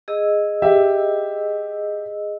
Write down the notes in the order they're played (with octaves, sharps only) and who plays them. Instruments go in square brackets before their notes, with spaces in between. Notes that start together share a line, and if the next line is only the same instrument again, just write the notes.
[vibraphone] G#4 D#5 E6
[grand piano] G4 E5